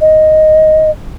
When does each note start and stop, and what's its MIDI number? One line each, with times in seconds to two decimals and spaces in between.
0.01 0.90 75